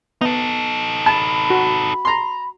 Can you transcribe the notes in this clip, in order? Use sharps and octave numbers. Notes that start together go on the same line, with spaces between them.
B3 D#4 A4
A5 B5
F#4
A#5 C6